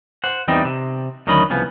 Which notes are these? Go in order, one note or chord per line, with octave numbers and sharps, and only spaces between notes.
C5 F#5
E2 E3 G3 C4 D#4 D#5
C3
D2 D#3 F#3 C#4 D#5 B5
C2 C#3 F3 B3